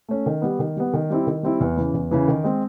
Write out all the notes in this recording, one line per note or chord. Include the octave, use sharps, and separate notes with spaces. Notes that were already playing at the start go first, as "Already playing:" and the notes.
A3 C#4
D#3
G3 B3
D#3
G3 B3
D#3
G3 C4 E4
D#3
G3 C4 E4
E2
C#3 E3
E2
C#3 E3
D#3
G#3 C4